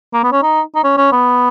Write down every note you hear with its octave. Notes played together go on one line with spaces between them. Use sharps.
A#3
B3
C#4
D#4
D#4
C#4
C#4
B3